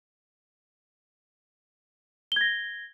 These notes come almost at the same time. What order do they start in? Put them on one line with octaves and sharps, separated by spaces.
G7 G#6 A#6